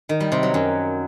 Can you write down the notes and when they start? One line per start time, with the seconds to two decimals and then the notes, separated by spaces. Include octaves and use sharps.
0.09 D#3
0.20 G3
0.32 C3
0.43 F#3
0.54 F#2